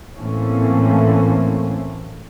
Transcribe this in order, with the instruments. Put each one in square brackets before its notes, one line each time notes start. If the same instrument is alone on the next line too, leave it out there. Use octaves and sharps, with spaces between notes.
[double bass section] A2 E3 A3 A#3 C4 C#4